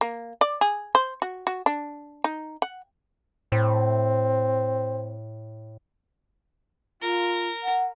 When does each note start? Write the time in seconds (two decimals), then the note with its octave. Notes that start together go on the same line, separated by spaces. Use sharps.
0.01 A#3
0.41 D5
0.61 G#4
0.95 C5
1.22 F#4
1.47 F#4
1.66 D4
2.24 D#4
2.62 F#5
3.52 A2 C4
7.02 F4 A#4
7.63 F#5